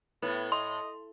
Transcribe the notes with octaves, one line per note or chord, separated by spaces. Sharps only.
A2 B3
D#5 C6